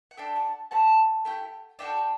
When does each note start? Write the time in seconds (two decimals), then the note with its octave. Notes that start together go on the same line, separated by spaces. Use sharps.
0.11 F#5
0.17 D4 A4 E5 G5
0.36 F#5 A5
0.71 A3 C4 G4 F#5 A5
1.25 A3 E4 G4
1.79 D4 F#4 A4 E5 G5